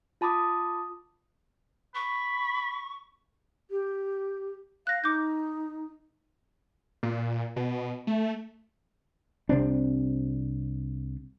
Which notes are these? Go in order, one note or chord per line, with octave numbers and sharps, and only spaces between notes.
F4 A5 B5 D6 D#6
B5 C#6
G4
F5 F#6 A#6
D#4 D6 G6
A#2
B2
A3
C2 C3 C4 D4